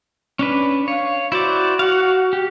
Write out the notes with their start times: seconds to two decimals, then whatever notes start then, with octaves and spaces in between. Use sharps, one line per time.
0.39 C#4 D4 B4
0.88 C#5 F5
1.32 E4 F#4 C5 D5
1.79 F5 F#5
2.33 G4